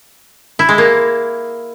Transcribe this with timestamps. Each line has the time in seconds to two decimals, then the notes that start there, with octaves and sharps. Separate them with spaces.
0.59 E4
0.69 G#3
0.78 A#3